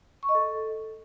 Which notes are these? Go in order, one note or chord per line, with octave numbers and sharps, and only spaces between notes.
C#6
D#5
A4